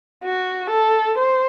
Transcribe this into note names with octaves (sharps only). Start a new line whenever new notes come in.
F#4
A4
C5